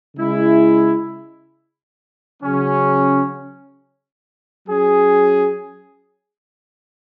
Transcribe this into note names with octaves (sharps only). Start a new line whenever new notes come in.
C#3 G#3 E4
C#3 F#3 C#4
F#3 C#4 G#4